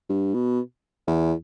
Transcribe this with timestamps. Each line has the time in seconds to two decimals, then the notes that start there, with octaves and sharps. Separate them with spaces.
0.10 G2
0.34 B2
1.07 E2